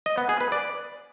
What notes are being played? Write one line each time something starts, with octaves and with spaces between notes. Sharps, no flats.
D#5
B3
G#4
B4
D5